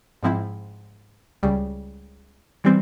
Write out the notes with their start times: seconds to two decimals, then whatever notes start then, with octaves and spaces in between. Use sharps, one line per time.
0.23 G#2 F3 C4 E4
1.43 C#2 C#3 G3
2.64 E3 G3 C4